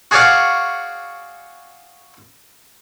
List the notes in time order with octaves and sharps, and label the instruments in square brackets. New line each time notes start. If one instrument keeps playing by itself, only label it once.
[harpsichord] F#4 G#4 C#5 D5 F5 F#5